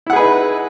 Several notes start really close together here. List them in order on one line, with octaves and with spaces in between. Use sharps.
E4 F#5 G#4 B4 D#4